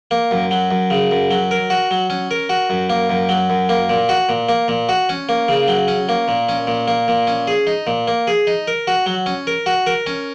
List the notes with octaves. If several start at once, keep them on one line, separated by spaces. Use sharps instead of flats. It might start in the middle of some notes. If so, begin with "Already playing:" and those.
A#3
F#2
F#3
F#2
C#3
F#2
F#3
A#4
F#4
F#3
C#4
A#4
F#4
F#2
A#3
F#2
F#3
F#2
A#3
A#2
F#4
A#2
A#3
A#2
F#4
C#4
A#3
C#3
F#3
C#4
A#3
A#2
C#4
A#2
A#3
A#2
C#4
G#4
D#4
A#2
A#3
G#4
D#4
A#4
F#4
F#3
C#4
A#4
F#4
A#4
C#4